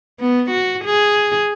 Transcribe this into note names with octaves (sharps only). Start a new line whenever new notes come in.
B3
F#4
G#4